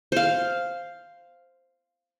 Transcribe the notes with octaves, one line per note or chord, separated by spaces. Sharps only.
C5 F5